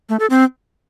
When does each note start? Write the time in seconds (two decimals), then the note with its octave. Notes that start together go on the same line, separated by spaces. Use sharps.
0.09 A3
0.20 A4
0.30 C4